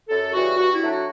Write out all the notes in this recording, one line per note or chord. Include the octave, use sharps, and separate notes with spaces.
F#2 A4
C#3 E3 G3 F#4
G2 F#4
E4
F#3 A3 D4
F#4